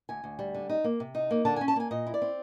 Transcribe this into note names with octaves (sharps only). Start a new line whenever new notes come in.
D2 G#5
D2
G3
D3
D#4
A#3
C3
D#4
A#3
D3 A5
C#4 G#5
A5
A#3 G#5
A#2 D#5
E4
D5
C4